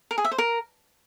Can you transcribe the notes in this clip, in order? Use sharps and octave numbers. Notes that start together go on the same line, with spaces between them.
A#4
G#4
E5
C5
A#4